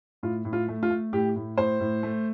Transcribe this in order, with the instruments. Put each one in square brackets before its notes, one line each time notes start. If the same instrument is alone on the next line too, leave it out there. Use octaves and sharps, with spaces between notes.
[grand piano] A2 F4
A2
F4
A3
F4
A3
A2 G4
A2
A2 C5
A2
A3